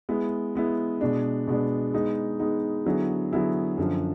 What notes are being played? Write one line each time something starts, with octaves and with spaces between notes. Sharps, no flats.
G#3 B3 E4
G#3 B3 E4
B2 G#3 B3 D4
B2 G#3 B3 D4
G#3 B3 D#4
G#3 B3 D#4
D3 F#3 B3 E4 G#4
D3 F#3 B3 E4 G#4
F#2 D3 F3